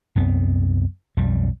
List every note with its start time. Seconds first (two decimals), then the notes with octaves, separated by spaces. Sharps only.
0.15 C2 F#2 B3 C4
1.17 B1 F2 G3